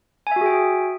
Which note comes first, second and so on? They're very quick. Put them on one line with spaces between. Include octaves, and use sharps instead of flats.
G#5 E5 F#4 G#4 G5